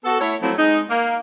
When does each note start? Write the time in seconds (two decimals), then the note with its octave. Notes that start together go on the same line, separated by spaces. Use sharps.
0.05 B3 F#4 A4
0.21 A3 E4 C#5
0.43 F3 F#3 A3 C4 E4
0.58 G#3 D#4
0.90 A#3